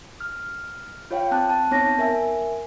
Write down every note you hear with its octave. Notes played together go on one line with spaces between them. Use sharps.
F6
F4 C#5 F5 G5
C4 A5 F#6
A5
B3 C4 D#4 C#5 A5 A#6
A#4 E5 G#5